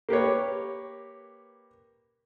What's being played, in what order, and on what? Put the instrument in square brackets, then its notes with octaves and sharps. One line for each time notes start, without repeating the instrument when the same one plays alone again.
[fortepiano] A#3 G4 B4 C#5